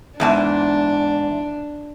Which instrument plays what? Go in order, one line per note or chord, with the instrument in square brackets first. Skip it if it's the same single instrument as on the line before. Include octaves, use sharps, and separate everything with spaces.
[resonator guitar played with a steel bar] E2 G#2 A5 [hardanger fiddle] D4